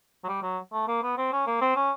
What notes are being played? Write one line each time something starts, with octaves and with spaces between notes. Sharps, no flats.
F#3
G3
F#3
A3
A#3
B3
C4
C#4
A#3
C4
C#4